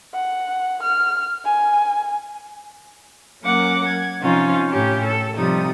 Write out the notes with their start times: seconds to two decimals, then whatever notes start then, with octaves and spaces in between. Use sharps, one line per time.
0.14 F#5
0.83 F6
1.45 G#5
3.42 F#3 A#3 C#4 A#4 F#5 D6
3.87 G#6
4.21 C3 F3 C#4 D#4 F4
4.71 A2 C#4 G4
5.04 A4
5.37 C3 F3 G3 D#4 D#6